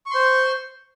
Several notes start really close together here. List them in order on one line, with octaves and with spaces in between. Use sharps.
C#6 C6 C5